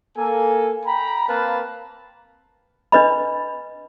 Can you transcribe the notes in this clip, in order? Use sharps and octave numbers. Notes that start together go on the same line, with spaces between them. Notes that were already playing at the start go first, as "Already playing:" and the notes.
A#3 A4 G#5
G5 A#5 B5
A#3 C4 A#4 B4 F5 A5
D4 B4 D#5 B5